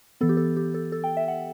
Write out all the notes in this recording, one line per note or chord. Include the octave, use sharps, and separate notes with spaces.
E3 B3 A4
G4
A4
G4
A4
A4
G5
E5
F#5